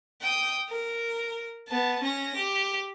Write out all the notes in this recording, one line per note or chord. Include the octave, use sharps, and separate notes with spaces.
G5 D#6
A#4
B3 A5
C#4 A#6
G4